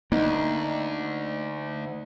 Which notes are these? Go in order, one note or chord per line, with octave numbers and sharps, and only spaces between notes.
D2 A#3 D#4